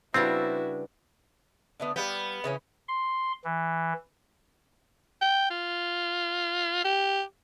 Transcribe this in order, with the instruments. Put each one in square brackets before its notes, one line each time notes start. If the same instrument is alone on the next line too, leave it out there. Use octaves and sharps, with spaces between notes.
[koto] C#3 G3 D4 [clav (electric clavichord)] C4 [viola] E4 F#4 [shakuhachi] B4
[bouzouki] D3 A3 B3
[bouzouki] G3 F5 G5 [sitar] B3
[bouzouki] C#3 E3 C#4
[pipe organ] C6
E3
[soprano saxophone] G5
F4
G4